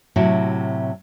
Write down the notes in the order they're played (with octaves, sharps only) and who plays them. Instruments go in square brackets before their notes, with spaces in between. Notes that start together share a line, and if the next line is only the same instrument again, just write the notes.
[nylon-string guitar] A2 C3 F#3 E4 F#4